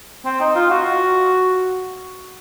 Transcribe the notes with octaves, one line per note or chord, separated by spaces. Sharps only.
C4
D#4
F4
F#4